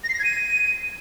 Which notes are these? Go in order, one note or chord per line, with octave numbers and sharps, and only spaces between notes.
A#6
C7
A#6
G#6
D#7